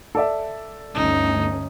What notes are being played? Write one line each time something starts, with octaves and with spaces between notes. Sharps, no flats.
A4 D5 E5
G1 D2 C#4 D#4